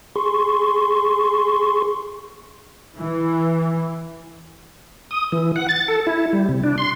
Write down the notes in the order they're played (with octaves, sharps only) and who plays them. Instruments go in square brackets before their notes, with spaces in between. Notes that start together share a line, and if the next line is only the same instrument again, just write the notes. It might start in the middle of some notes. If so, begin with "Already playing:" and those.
[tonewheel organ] G#4 C6 C#6
[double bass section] E3
[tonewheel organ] D#6
E3
F#5
A6
A4
E4
G3
C3
D4
C6